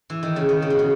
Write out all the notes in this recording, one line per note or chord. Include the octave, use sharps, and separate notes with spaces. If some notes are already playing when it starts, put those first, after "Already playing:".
E3
D#3
C#3
D#3
C#3
B2
C#3